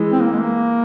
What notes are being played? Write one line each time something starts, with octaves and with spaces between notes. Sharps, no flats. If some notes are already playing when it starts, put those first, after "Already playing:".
Already playing: E3 G#3
C4
A#3
G#3
A#3